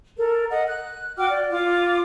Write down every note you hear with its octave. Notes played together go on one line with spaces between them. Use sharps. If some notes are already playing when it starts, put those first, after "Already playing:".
A4 A#4
D#5 F#5
F#6
F#4 G5 D6 F6
D5
F4 D6